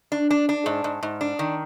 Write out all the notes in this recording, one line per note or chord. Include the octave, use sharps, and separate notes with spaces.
D4
D4
D4
G#2
G#2
G#2
D4
D#3